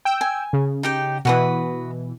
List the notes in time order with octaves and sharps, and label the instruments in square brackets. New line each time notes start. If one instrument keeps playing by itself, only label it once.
[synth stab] G5 E6
[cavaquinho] G#5
[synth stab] C#3
[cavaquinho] D#4 G4 G5
[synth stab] B2 E3 [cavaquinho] F#4 B4 D#6